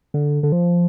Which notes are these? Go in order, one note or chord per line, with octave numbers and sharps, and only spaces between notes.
D3
D3
F3